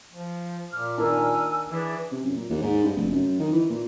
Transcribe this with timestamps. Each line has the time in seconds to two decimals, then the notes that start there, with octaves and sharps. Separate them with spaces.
0.12 F3
0.72 A#2 D6 F6
0.98 D#3 A#3 D4 G#5 E6
1.71 E3 D4 G#4
2.12 C3
2.23 F#2
2.36 A#2
2.50 D#2
2.61 G#2
2.84 G2
2.96 F1
3.12 F#2
3.39 D#3
3.52 E3
3.70 A#2